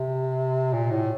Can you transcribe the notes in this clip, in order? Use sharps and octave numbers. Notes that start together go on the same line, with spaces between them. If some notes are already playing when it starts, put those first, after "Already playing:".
Already playing: C3
A#2
A2